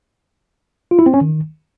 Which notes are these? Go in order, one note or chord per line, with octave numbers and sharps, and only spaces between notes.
F4
E4
C4
C#4
D#3